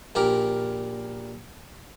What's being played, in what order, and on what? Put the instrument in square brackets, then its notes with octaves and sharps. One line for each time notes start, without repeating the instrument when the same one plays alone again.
[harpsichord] A#1 A#2 G4 A#4